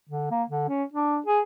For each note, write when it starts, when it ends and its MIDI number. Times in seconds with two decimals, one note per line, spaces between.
0.09 0.28 50
0.31 0.43 58
0.50 0.67 50
0.69 0.84 61
0.94 1.18 62
1.26 1.41 68